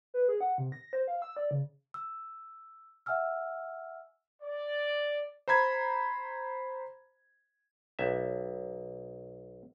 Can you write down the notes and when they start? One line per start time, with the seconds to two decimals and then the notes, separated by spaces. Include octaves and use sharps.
0.14 B4
0.28 G#4
0.41 F#5
0.58 C3
0.72 A#6
0.93 C5
1.08 F5
1.22 E6
1.37 D5
1.51 C#3
1.94 E6
3.06 E5 F#5 G#5 E6 F6
4.42 D5
5.48 C5 A#5 B5 G#6
7.99 B1 E5